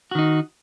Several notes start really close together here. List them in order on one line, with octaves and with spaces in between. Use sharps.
F#4 D#3 D#4